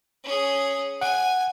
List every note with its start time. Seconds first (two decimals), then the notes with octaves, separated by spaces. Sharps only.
0.24 C#4 G#4
1.01 F#5 G#5